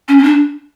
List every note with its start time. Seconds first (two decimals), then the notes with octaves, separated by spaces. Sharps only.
0.08 C#4
0.18 C#4
0.23 D4